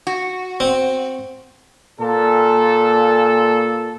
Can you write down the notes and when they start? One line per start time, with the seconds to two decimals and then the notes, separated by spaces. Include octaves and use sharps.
0.07 F#4
0.60 C4
2.00 A#2 A4